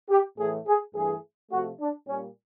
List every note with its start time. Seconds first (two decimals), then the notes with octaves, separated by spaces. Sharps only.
0.10 G4
0.38 A2 E3 A3 G#4
0.66 G#4
0.95 G2 E3 A3 G#4
1.51 C3 F3 A3 F#4
1.80 D4
2.07 A#2 G3 C#4